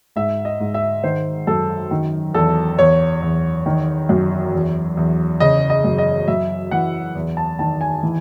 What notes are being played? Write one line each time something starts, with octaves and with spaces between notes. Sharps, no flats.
G#2 E5
D#5
G#2
E5
D#3 C5
F#2 A4
D#3
E2 A4
E2 C#5
E2
D#3
F#2
E2
E2
C#3 D#5
D#5
F#2
D#5
F#2 E5
E3 F#5
E2
A5
D#3 A5
G#5
E3